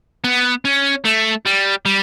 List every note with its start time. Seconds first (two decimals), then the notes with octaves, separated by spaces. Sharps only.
0.24 B3
0.65 C#4
1.05 A3
1.46 G3
1.85 G3